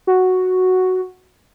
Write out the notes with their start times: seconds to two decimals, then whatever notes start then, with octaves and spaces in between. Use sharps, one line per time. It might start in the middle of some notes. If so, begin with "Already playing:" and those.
0.07 F#4